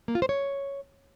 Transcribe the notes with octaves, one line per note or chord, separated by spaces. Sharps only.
A#3
F4
C5
C#5